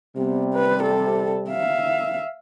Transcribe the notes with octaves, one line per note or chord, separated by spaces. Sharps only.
C3 G3 B3
B4
A4
E5 F5